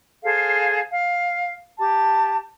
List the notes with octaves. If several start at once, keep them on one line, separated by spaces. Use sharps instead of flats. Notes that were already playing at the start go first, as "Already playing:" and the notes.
G#4 A4 C5 F5
F5
G4 A5